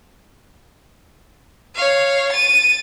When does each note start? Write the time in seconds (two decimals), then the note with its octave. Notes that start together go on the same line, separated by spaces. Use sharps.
1.76 C#5 F5
2.32 A6 D#7